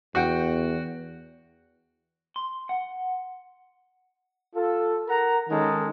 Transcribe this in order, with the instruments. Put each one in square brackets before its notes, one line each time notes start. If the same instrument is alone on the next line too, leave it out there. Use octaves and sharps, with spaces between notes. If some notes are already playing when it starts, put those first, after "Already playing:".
[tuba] E2 [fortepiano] F#4 F#5 G5
[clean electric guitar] C6
F#5
[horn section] F4 A4
A#4 F#5 A#5
D#3 G#3 C#4 D#4 A4